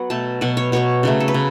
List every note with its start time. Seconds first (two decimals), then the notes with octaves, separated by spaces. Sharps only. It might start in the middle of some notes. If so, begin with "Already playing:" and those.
Already playing: F#3 B3 F#5
0.10 B2 A3 A5
0.41 B2 F#3 B3 F#5
0.57 C#5
0.72 B2 F#3 B3 C#5
1.03 C#3 F#3 A3
1.20 A4
1.28 B4
1.34 C#3